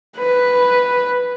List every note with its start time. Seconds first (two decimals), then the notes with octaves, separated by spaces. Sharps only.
0.17 B4